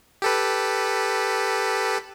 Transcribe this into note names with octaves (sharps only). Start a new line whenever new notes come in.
G4 A4 B4